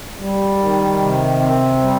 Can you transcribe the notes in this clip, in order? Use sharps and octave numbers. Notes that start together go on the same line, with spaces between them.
G3
D#3
C3
C4
G3